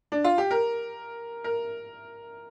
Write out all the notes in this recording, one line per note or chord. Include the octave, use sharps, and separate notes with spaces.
D4
F4
G4
A#4
A#4